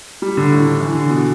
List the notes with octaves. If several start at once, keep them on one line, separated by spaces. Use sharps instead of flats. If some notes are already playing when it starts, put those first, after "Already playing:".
G3
D3
A2
D3
E3
D3
B2